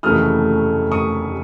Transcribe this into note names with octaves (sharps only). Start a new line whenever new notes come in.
F1 D#2 C#3 E3 A3 D#6 F6
C#6 D#6